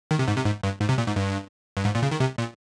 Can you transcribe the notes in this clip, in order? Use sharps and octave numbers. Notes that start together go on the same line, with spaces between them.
D#3
C3
G#2
C3
G#2
G2
G#2
C3
A#2
G#2
G2
G2
G#2
A#2
C#3
D#3
C3
A#2